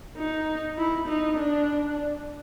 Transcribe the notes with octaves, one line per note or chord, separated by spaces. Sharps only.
D#4
E4
D#4
D4